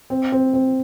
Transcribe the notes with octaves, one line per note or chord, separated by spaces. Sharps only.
C4
C4
C4